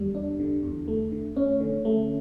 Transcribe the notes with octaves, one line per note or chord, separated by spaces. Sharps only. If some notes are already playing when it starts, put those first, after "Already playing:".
Already playing: E2 D3 G3
D4
D3
E2
A3
D3
C#4
D3
A3